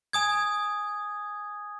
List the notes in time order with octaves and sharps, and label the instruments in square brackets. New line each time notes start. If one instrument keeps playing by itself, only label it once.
[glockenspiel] G#5 D#6 G#6